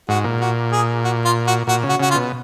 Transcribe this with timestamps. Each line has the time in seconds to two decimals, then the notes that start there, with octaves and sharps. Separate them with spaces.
0.09 G#2 F#4
0.24 A#2
0.40 F#4
0.72 G#4
1.04 F#4
1.25 F4
1.47 F#4
1.67 A#2 F#4
1.83 C#3
1.89 F#4
2.00 C#3 F#4
2.10 F4
2.15 B2